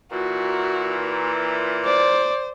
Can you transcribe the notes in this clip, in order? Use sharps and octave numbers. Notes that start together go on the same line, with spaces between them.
A#2 E3 F#4
C5 D5